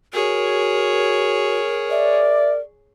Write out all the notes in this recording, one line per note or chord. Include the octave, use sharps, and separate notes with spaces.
F#4 G#4 A#4 C#5
D5 E5